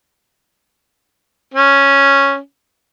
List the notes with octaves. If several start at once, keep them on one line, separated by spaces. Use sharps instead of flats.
C#4